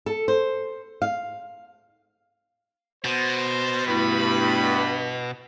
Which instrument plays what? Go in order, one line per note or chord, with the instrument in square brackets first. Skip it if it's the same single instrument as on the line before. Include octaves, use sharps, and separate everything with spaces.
[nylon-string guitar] A4
C5
F5
[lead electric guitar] B2 [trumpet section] C5
[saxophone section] G2 [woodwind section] A3 E4 [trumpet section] B5